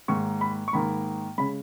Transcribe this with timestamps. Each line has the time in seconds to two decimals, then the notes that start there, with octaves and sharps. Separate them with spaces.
0.08 G#2 D#3 A#3 C#6
0.41 B5
0.68 C#6
0.73 G#2 D#3 A#3 B5
1.38 C#3 G#3 B5